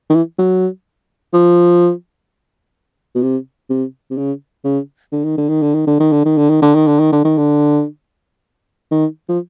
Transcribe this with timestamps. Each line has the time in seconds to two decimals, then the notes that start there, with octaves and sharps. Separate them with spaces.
0.10 D#3
0.15 E3
0.39 F#3
1.33 F3
3.15 B2
3.22 C3
3.70 C3
4.11 C3
4.18 C#3
4.65 C#3
5.12 D3
5.25 D#3
5.38 D3
5.49 D#3
5.62 D3
5.75 D#3
5.87 D3
6.00 D#3
6.12 D3
6.25 D#3
6.38 D3
6.50 D#3
6.62 D3
6.75 D#3
6.87 D3
7.00 D#3
7.12 D3
7.25 D#3
7.38 D3
8.91 D#3
9.29 F3